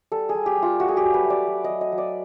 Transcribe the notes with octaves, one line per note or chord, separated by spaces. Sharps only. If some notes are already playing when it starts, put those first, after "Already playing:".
G3 A4
G#4
G3
G4
G3 F4
A3 F#4
G#4
F#3 G4
B4
A3
D5
F#3
D#5
F#3
D#5
F#3
D5